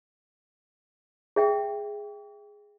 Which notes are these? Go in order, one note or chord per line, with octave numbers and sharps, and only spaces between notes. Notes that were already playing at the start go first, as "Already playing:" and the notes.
G#4 E5 G5